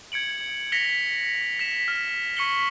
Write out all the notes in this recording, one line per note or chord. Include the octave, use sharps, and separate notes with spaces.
G#6 C#7 D7 F#7
A#6 B6 C#7 F7 G7
B6 E7
F6
C#6 B6 C#7 F#7 G7